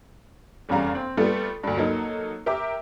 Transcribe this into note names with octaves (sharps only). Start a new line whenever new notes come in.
F1 E2 C#3 G3 F5 A#5
C4
G3 A3 B3 F4 A4
D2 G2
F#3 A#3 D#4 A4
G4 A#4 E5 D6